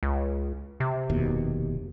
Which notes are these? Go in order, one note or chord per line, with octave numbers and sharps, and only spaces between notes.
C#2
C3
F1 D#2 B2